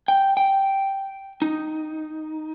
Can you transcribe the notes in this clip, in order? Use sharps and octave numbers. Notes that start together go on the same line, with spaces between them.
G5
G5
D#4